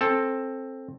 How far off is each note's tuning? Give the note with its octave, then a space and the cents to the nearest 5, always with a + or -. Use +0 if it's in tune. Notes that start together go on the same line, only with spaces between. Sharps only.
C4 +15 A4 +0